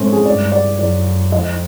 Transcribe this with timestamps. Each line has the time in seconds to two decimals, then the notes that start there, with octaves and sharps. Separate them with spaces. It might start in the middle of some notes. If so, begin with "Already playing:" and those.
Already playing: G#2 A3 C4 C#4
0.13 G#4
0.26 G2 D5
0.52 D5
0.79 F#2 D5
1.32 F2 D#5